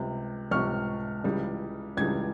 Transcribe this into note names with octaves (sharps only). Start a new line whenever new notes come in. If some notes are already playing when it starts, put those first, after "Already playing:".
Already playing: C#2 C3 G3
C#2 C3 G3 C#6 F6
C#2 C#3 E3 G3
C#2 C#3 E3 G3 G#6